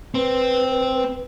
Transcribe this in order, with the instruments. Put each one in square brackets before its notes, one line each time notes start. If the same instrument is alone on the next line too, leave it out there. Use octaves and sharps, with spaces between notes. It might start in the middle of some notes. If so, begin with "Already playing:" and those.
[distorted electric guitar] C4 [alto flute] B4